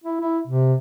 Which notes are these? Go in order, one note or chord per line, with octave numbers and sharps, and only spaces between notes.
E4
E4
C3